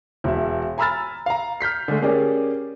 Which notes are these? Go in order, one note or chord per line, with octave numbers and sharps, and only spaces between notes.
E1 E5
G#5 A#5 B5 E6 F6 A6
F5 A#5
F6 G6 B6 C7
D3 G#3 A3
A#3 C#4 G4 G#4 D5